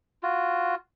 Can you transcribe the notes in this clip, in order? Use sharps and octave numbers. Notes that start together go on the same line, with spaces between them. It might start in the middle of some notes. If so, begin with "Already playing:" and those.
F4 F#4